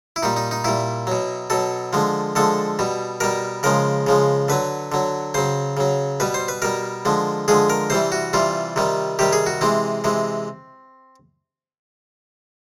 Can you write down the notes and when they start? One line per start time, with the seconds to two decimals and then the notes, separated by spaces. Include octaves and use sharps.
0.16 E4
0.23 A#2 G3 D#4
0.36 D#4
0.51 D#4
0.64 A#2 G3 E4
1.07 B2 F#3
1.50 B2 F#3 A4
1.93 D3 F3 G#3
2.35 D3 F3 G#3 A4
2.79 B2 G3
3.20 B2 G3 A#4
3.63 C#3 F3 G#3 A#4
4.07 C#3 F3 G#3
4.48 D3 F#3 B4
4.92 D3 F#3
5.34 C#3 F#3 C5
5.77 C#3 F#3
6.20 B2 G3 B4
6.34 C5
6.48 B4
6.62 B2 G3 A#4
7.05 D3 F3 G#3
7.48 D3 F3 G#3 G#4
7.70 A#4
7.90 C3 E3 G3 C5
8.12 F#4
8.33 C3 E3 G3 F4
8.76 C3 D#3 G3
9.19 C3 D#3 G3 G4
9.33 G#4
9.46 F#4
9.61 C3 E3 G#3 C4
10.04 C3 E3 G#3